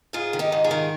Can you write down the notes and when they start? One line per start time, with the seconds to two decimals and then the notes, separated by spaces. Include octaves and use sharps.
0.13 G#2 F4 G#4
0.33 D#3
0.39 D#4 G4
0.52 G#2
0.64 F4 G#4
0.71 D#3